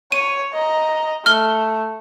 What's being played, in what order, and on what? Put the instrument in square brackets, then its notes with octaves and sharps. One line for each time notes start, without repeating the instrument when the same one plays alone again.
[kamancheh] C#5 [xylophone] D#7
[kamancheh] D#5 A#5
[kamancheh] A3 [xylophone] F6 G7